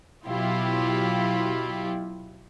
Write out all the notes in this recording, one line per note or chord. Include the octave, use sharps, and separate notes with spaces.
B2 F#3 E4 F4 G4